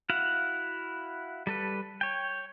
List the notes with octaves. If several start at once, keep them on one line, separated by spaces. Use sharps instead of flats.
E4 F#4 F5 F#5
G3 A4 B4
C#5 G5